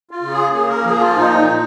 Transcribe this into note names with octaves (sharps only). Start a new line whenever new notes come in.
F4
C#3
G#4
A#3 G#4
A#4
F3 G#4
F4
A#2 D#4
A#2